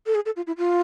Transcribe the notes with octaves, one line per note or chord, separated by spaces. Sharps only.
A4
G#4
A4
F4
E4
F4